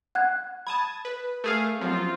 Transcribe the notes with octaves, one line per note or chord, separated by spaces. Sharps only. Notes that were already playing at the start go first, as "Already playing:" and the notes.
F#5 F#6 G#6
A5 B5 D#6 G#6
B4
A3 G#4 A#4 F5
F#2 F3 F#3 C4 F4